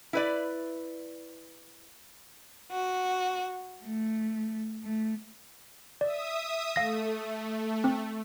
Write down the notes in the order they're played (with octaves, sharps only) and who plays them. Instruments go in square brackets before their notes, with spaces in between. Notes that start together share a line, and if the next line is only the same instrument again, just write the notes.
[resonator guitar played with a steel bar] E4 B4 D5
[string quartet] F#4
A3
A3
[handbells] D5 [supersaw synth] E5 D#6
[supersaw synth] A3 [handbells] F5 A#6
[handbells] C4